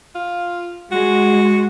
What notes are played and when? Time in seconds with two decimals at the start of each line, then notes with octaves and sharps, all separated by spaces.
0.15 F4
0.92 G#3 F#4